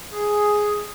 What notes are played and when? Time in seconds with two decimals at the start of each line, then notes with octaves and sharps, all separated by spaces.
0.12 G#4